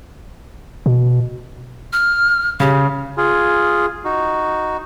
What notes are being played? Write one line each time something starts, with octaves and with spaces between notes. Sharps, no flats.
B2
F6
C#3 G4
F4 G#4
D#4 F#4